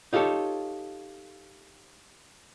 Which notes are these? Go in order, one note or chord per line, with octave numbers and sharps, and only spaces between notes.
D#4 F4 G4 A4 C#5